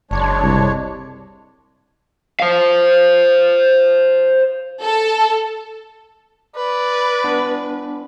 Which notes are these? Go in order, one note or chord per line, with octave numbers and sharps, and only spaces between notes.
F#1 G#3 D4 C#5
C2
C5 F5
A4
B4 D5
B3 D4